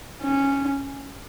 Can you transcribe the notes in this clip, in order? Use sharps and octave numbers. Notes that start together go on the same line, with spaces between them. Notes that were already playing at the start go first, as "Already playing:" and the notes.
C#4